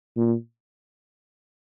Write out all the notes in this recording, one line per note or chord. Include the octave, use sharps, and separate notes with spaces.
A#2